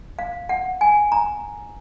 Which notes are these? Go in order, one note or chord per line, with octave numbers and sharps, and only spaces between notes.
F5
F#5
G#5
A#5